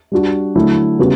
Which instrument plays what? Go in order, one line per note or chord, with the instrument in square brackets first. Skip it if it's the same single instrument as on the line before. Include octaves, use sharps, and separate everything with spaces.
[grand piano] G3 D4 F#4
D3 F#3 A3 E4
C#3 G3 B3 F#4